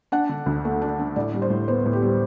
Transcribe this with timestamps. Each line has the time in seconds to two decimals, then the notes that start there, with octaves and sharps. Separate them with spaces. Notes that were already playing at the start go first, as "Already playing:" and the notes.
0.12 D4 F#5
0.29 D3
0.46 D2
0.65 A3
0.82 D4
0.99 D3
1.16 A2 D5
1.34 G3
1.42 C5
1.50 A2
1.68 B3 C5
1.86 A2
1.93 G4
2.02 G3